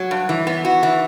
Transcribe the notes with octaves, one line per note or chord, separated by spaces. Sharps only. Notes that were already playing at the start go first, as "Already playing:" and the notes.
Already playing: F#3
G2
E3
B3
F#4
E3